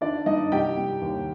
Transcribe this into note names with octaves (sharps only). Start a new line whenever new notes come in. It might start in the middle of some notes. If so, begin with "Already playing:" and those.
D#3 D4 D5
G2 D#4 D#5
C2 G4 G5
C2
D#2